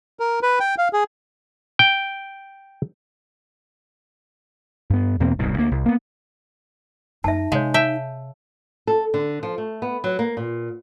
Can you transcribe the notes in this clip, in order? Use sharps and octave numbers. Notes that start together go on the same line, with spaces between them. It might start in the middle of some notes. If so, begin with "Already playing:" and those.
A#4
B4
G5
F5
G#4
G5
G2 B3
E2 B2 A#3 C4
D#1 C2 G#2 B2
D2 A#3
C2
A#3 B3
F#2 A#3 D#4 E5 A5
C3 G#3 C#5 F5
E5 G5 A5
A4
D3
F3
A3
B3
F#3
A#3
A#2